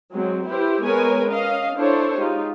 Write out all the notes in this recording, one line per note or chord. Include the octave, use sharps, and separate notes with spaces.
F#3 G#3 C4
E4 G4 B4 C5
G#3 B3 A#4 B4 C#5 G#5
C#4 D#5 F5
D4 E4 A4 C5 C#5
G#3 D#4 F4 G4